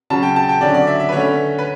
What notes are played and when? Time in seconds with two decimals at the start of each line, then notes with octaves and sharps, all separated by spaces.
0.10 C#3 F#3 C#4 A5
0.23 G5
0.36 A5
0.49 G5
0.61 D3 F#3 C#4 D5
0.74 D5
0.87 E5
1.00 E5
1.09 B4
1.12 D3 A3 C#4 C#5
1.59 B4